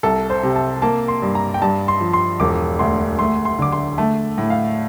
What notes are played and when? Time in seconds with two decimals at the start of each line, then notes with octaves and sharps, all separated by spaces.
0.03 C2 A4
0.30 C5
0.43 C3
0.56 A5
0.82 A#3 A5
1.08 C6
1.22 G2
1.35 A#5
1.54 G5
1.62 G2 A5
1.88 C6
2.01 F3
2.13 C6
2.40 E1 D6
2.79 D2 C6
3.19 A3 C6
3.45 C6
3.59 D3 D6
3.72 C6
3.98 A3 A5
4.38 A2
4.50 F5